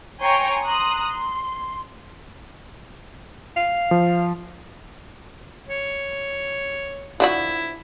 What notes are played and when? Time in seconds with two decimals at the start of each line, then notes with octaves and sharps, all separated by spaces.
0.21 C#5 G5 G#5 A#5 C6 C#6
0.63 A#5 C6 D#6 F#6
1.09 C6
3.56 F5
3.91 F3
5.69 C#5
7.20 D3 F3 E4 F#4